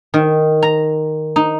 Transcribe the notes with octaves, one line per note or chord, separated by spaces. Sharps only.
D#3
A#5
D#4